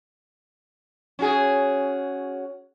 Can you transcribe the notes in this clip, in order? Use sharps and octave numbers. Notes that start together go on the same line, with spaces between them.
C#4 F#4 G#4